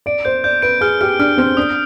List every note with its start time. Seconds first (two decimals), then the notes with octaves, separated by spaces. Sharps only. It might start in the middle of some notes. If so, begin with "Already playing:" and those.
0.06 D5 D7
0.25 C5 G6
0.44 D5 G6
0.62 B4 D7
0.81 G#4 F6
1.01 G4 F6
1.19 D4 F6
1.38 C4 F6
1.57 D4 D#6